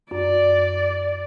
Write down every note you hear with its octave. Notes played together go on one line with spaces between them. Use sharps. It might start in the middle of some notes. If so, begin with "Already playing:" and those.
F#2 D5